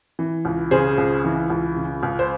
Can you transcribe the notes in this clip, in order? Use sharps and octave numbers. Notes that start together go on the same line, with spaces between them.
E3
C#2
C#3 G#4 C5
C#2
E3
C#2
C#3
C#2
C5